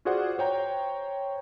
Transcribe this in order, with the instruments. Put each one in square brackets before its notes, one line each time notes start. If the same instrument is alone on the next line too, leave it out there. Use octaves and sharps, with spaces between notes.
[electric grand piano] F4 F#4 G#4 C5 D5 F#5
C5 C#5 G5 A#5